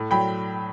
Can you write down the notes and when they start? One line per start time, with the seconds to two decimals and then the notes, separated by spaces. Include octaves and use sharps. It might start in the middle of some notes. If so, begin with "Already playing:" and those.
Already playing: A2
0.11 F#3 G5 B5